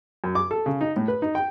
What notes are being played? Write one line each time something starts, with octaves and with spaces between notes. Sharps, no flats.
F#2
D6
A4
C#3
D#4
A2
B4
D#4
G5